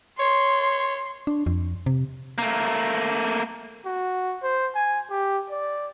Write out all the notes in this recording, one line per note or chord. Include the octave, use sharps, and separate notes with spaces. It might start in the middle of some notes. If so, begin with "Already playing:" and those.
C#5 C6
D4
F2
C3
A3 A#3
F#4
C5
G#5
G4
D5